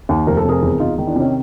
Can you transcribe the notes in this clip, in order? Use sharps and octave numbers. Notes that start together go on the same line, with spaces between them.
D#2
F1 A#4
A4
C3 G#4 A#4
E2
E2 D#4 F4
D#3
D4 E4
C3 C#4 D#4